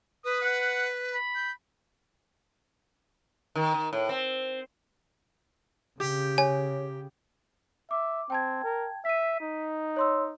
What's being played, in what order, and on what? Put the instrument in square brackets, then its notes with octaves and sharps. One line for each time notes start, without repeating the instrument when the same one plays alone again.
[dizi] B4 [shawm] D#6
[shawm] F#5
B5
[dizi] G6
[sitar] D#3
D#3
A2
C4
[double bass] C#3 [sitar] G4
[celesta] C#5 [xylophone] G#5
[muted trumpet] E5 [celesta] D6
[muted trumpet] C4 [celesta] G5 A5 G#6
[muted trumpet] A#4
[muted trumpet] E5 [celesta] B6 D#7
[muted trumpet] D#4
[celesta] C#5 C6 E6